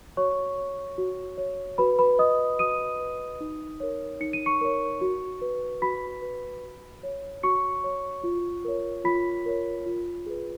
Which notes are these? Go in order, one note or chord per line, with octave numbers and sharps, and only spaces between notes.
F#4 C#5 C#6
C#5
F#4
C#5
F#4 B4 B5
B4 B5
B4 D#5 D#6
F#4 D#6 D#7
B4
D#4
A#4 C#5
D#4 C#7
D#7
C#6 C#7
A#4 C#5
F#4
B4
F#4 B5 B6
B4
F#4
C#5
F#4 C#6 C#7
C#5
F4
A#4 C#5
F4 B5 B6
A#4 C#5
F4
G#4 B4